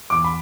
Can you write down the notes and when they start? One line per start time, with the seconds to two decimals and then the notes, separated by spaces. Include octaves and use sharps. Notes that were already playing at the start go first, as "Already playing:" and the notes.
0.10 E2 D6
0.24 B5